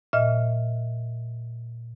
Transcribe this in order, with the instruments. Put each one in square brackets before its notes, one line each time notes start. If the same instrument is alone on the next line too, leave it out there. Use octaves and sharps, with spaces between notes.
[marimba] A#2 D#5 E5 F6